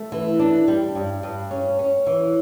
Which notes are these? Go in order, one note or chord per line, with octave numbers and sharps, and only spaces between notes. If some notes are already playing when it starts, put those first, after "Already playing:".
Already playing: A3
E3
D4
G3
G2
G2
C#4
C#4
E3